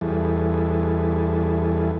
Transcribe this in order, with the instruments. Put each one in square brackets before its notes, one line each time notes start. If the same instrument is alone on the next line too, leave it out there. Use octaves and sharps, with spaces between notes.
[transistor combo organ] E2 E3 G3 G#4 A4